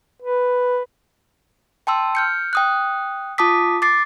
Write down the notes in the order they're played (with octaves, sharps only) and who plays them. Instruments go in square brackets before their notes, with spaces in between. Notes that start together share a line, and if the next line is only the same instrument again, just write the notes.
[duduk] B4
[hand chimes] G5 A5 C6 E6
F6 G6 C#7
G5 D#6 F#6
F4 A5 D6 D#6 B6
D6 A6 C7